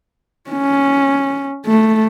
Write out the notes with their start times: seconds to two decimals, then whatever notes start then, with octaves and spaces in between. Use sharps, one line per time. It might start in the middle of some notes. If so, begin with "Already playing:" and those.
0.51 C#4
1.67 A3